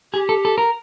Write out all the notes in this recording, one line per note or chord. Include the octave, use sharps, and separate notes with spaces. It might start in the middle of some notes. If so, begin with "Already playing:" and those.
G4 G#4
A4
A4
A#4